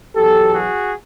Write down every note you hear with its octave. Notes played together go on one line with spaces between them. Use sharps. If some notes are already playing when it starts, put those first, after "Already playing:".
E2 B2 F#3 G4 A4
F#4 G#4